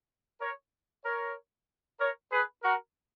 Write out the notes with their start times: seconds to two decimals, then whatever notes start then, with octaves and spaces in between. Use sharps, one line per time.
0.41 A#4 C#5
1.05 A#4 C#5
2.00 A#4 C#5
2.32 G#4 B4
2.63 F#4 A#4